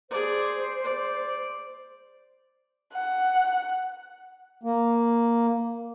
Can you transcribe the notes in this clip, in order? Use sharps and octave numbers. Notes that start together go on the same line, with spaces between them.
G#4 C5 D5
D5
F#5
A#3